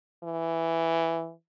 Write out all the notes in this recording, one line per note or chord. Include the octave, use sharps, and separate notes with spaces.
E3